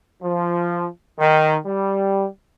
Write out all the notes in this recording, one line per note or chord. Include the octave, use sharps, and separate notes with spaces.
F3
D#3
G3